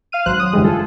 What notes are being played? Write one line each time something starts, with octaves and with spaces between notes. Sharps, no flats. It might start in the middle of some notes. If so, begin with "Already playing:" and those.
F5 F6 D#7
G#1 F#3 C5 F#6
F#3 D#6
F#2 D3 E3 G3 G#3
F4 G#4 A4